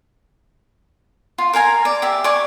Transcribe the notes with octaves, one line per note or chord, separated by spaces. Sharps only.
F4
A#4 F5 G#5 A#5
D5
G4 E5
D5 G#5 C#6 D6